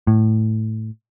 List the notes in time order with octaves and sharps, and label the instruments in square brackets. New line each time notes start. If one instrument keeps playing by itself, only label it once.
[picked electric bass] A2